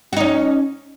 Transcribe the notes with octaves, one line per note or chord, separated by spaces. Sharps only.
C#4 D#4 F#4